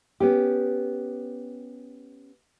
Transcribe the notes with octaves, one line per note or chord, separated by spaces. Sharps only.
B3 C#4 G4